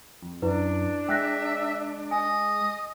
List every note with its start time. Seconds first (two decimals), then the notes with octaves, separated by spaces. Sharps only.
0.22 F2
0.42 F#2 D4 E4 B4
1.09 G#3 E5 G5 F#6 A#6
2.11 D#5 G#5